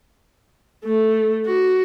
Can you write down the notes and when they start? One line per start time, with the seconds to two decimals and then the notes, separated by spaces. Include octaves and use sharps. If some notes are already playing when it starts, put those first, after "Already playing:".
0.84 A3
1.46 F#4